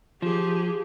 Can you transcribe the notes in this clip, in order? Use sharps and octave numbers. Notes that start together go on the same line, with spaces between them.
F3 G4 G#4